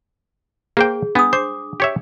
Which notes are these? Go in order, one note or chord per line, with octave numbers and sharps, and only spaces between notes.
A#3 G#4 C5 G5
B3 D4 D#6
C5 D6
G4 C#5 E5